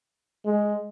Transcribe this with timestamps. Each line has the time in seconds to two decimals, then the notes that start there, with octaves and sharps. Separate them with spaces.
0.45 G#3